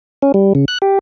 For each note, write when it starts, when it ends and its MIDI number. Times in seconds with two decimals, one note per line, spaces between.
0.22 0.32 61
0.34 0.53 55
0.55 0.65 49
0.68 0.78 90
0.82 0.99 67